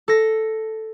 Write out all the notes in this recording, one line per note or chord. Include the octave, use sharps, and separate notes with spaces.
A4 A#6